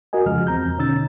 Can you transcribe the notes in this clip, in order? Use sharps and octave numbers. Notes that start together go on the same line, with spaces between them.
F#4 A#4 D#5 G#5
F2 C#3 F3 G#3 F6
E2 C4 A#5 G6
B2 D3 C#4 D#4 E6 A6